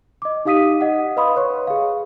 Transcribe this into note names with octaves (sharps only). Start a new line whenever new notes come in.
D#5 D6
D#4 G4 F5 D#6 B6 D#7
D#5 F#5
B4 D#5 F5 B5 C6 D#6
B4 C#5 C#6
G#4 F5